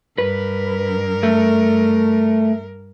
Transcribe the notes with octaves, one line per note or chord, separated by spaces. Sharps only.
G2 A#4 B4
A3